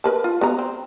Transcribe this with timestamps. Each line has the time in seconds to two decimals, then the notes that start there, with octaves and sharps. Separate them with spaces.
0.04 A#4 B4 A5
0.24 F4
0.41 B3 F#4 A#5
0.59 C4